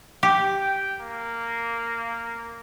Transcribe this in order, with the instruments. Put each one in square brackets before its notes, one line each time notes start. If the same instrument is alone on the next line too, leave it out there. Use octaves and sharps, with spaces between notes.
[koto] G4
[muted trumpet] G5
A#3